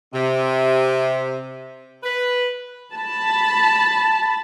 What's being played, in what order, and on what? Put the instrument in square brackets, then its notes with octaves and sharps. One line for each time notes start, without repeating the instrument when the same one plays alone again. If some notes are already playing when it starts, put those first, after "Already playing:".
[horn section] C3
B4
[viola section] A5 B5